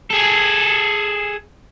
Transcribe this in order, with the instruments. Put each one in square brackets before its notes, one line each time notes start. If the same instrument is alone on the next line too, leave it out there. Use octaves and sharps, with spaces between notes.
[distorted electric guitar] G#4 A4